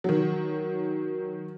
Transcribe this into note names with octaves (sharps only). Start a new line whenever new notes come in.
D#3 F#3